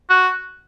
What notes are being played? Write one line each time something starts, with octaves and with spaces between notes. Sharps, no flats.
F#4